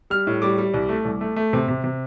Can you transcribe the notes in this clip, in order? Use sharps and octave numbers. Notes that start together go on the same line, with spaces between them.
G3 F6
A2
G3 D6
G3
C2
A3
C2
A3
A3
C3
C3
C3